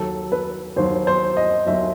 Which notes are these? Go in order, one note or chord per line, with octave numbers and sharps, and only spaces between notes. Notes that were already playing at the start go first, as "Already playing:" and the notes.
Already playing: D#2 D#3 F#3 A4
B4
D#2 D#3 F#3 C5
C5
D#5
D#2 D#3 F#3 E5